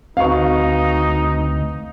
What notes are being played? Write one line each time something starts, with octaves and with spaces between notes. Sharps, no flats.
D2 C4 D#4 F#4 B4 F5 C#6